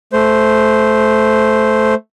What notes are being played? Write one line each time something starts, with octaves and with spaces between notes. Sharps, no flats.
A3 C5